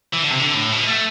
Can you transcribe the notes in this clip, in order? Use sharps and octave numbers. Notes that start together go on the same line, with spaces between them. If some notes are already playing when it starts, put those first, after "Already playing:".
E3
D3
C3
D3
A2
B2
A3